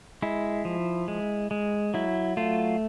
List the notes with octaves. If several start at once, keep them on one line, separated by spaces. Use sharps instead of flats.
G#3 E4
F3
G#3
G#3
F#3 E4
A3 F4